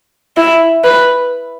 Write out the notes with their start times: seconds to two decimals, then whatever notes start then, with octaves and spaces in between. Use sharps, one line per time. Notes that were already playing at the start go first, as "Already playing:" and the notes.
0.37 E4
0.84 B4